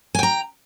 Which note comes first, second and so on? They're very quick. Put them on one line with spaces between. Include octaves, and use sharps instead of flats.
G#5 G5 A#5